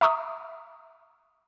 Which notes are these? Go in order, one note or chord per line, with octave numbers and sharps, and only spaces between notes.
E5 A#5 C#6 D#6 E6